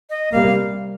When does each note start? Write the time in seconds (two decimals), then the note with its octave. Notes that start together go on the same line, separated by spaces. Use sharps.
0.10 D#5
0.32 C3 G3 A#3 F5